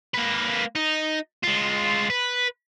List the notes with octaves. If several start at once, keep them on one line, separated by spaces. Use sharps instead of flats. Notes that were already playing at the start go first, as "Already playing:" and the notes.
A#3 B4
D#4
G#3 F4
B4